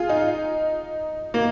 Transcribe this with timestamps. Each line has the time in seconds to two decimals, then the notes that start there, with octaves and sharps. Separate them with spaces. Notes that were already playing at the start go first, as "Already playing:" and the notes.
Already playing: F4 G#4
0.09 D#4
1.34 A#3